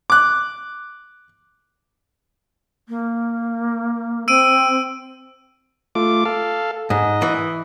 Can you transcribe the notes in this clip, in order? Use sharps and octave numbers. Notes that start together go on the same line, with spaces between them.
D6 F#6
A#3
C4 E6 D7 D#7
A3 F4 D6
A4 F5
G#2 D#5
E3